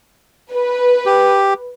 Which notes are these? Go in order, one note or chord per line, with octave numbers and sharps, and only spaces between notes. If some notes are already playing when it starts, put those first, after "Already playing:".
B4
G4